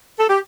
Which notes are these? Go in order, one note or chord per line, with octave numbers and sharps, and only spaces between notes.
A4
G4